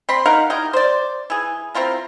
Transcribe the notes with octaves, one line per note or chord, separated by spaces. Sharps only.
C4 B5 C6
D#4 A#4 F5 F#5
D#4 E4 G4 A#4
C5 D5
E3 G#4
C4 E4 F4 A#4